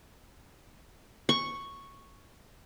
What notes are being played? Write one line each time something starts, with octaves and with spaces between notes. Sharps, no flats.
C#6